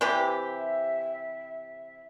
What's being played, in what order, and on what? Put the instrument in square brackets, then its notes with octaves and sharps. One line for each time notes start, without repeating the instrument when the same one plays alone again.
[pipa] C3 E3 G4 [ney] E5